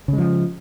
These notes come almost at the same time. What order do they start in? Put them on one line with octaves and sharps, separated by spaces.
C#3 G#3 F3